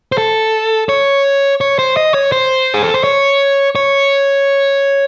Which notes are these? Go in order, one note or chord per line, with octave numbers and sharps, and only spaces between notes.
C5
A4
C#5
C#5
C5
D#5
C#5
C5
G#4
A4
C5
C#5
C#5